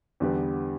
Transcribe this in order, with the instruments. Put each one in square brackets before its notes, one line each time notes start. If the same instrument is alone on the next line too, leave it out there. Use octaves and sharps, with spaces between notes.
[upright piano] E2 D3 G3 B3 G4